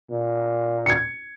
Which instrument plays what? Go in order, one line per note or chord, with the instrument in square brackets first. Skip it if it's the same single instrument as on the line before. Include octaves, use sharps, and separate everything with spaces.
[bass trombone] A#2
[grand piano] G#6 C#7